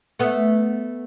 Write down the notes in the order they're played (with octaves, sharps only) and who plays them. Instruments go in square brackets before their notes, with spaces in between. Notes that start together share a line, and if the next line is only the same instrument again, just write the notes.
[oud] A3 B3